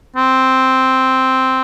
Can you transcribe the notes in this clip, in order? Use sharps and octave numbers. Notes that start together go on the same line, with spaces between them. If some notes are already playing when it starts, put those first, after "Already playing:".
C4